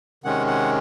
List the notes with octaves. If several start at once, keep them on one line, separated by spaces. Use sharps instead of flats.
C3 D#3 G#3 C#4 F#5
F#5